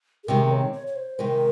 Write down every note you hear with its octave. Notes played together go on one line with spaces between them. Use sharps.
G#4
C3 D#3 G#3 A#4
C#5
C#5
C#5
C5
C3 D#3 G#3 A#4